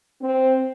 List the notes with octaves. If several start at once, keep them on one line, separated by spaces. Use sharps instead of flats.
C4